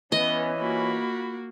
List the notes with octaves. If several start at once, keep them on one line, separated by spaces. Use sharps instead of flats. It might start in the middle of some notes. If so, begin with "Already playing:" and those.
E3 B3 C#4 D#5
A#3 F4 F#4 B5